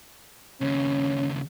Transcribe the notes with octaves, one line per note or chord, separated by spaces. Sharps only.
D#2 C#3 C#4